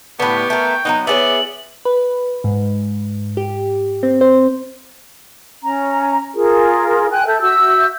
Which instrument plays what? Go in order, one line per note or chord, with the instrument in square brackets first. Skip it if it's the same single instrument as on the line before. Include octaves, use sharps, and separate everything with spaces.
[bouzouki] A2 D3 [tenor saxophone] B3 [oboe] G4 [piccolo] C#6
[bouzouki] A3 A#4 [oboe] G5
[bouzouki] F#3 G3 B3 [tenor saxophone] D#4
[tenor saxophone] B3 [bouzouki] E4 G#4 C#5 [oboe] D5 [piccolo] F#7
[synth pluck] B4
G#2
G4
C4
C5
[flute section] C#4 A#5
F4 G#4 A#4
G5 G#5 F#6
A4 E5 G6
F#4 E5 E6 G6